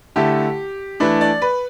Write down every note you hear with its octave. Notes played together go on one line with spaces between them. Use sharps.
D3 A3 E4 G4
E3 A3 D4 B4
D5
B4